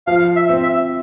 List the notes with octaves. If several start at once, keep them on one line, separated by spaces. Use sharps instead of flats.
F3 F5
E5
C4
E5